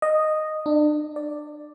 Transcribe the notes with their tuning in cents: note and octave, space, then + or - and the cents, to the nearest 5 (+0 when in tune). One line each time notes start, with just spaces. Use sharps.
D#5 -5
D4 +35
D5 +5